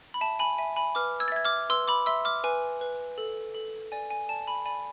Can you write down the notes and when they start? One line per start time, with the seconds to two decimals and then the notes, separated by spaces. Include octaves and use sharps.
0.14 B5
0.21 E5 A5
0.39 G#5 B5
0.58 E5 G#5
0.76 G#5 B5
0.95 B4 D6 F6
1.20 E6 G#6
1.28 A6
1.32 E5 G#6
1.45 D6 F6
1.70 B4 C6 E6
1.87 B5 D6
2.06 E5 C6 E6
2.25 D6 F6
2.44 B4 G#5
2.81 B4
3.18 A4
3.55 A4
3.92 D5 G#5
4.10 G#5
4.29 D5 A5
4.48 G#5 B5
4.65 D5 G#5 B5